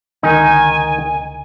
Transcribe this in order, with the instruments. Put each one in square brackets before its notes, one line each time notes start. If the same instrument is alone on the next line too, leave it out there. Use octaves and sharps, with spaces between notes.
[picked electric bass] C#2 D3 [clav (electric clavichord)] D#3 D#4 [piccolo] G#5